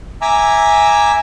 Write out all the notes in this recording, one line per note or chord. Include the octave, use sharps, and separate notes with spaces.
E5 G#5 A#5 D6 E6